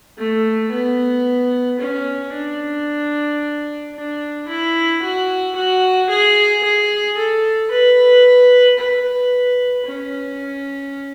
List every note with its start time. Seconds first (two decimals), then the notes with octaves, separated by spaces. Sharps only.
0.18 A3
0.72 B3
1.79 C#4
2.33 D4
3.94 D4
4.48 E4
5.02 F#4
5.56 F#4
6.09 G#4
6.64 G#4
7.17 A4
7.71 B4
8.78 B4
9.86 C#4